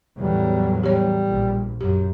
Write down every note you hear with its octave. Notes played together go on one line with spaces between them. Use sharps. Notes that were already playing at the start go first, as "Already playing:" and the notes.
E2 A2 F#3 G3
G3 G4 C#5
A#1
F#2 G4